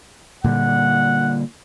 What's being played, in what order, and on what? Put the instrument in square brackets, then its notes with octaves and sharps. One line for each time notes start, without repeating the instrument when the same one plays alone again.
[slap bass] A#2 D3 G3 [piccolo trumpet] F#5